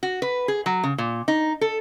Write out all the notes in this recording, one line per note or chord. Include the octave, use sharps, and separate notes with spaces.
F#4
B4
G#4
F#3
C#3
A#2
D#4
A4